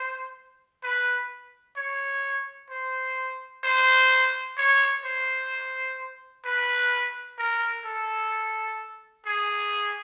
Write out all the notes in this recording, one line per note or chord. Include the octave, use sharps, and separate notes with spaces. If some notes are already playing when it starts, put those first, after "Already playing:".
Already playing: C5
B4
C#5
C5
C5
C#5
C5
B4
A#4
A4
G#4